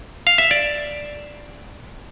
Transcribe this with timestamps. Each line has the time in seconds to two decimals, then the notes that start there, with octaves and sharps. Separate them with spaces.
0.27 F5
0.38 E5
0.51 D5